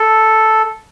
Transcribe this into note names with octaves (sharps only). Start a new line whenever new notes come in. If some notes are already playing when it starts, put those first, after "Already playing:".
Already playing: A4